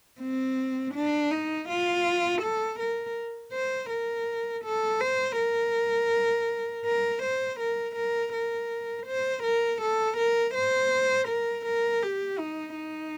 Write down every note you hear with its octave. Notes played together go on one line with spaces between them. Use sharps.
C4
D4
D#4
F4
A4
A#4
C5
A#4
A4
C5
A#4
A#4
C5
A#4
A#4
A#4
C5
A#4
A4
A#4
C5
A#4
A#4
G4
D#4
D#4